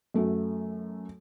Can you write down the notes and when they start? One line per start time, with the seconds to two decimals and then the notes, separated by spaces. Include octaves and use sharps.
0.14 F#2 A3 F#4